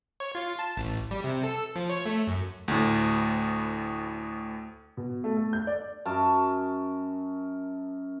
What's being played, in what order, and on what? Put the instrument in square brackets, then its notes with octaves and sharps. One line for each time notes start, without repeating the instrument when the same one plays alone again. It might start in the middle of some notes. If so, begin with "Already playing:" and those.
[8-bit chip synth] C#5
F4
A5
A1
G3
C3
A4
F3
C#5
A3
F#2
[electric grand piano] D2 A2
[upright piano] B2
A3
A3
G6
D5
[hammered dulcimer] F#2 A#4 A5